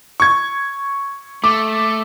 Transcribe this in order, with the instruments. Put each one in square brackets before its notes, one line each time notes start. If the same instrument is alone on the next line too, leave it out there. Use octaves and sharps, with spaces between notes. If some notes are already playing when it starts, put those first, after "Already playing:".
[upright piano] C#6 G#6
[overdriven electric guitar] A3 [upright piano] D6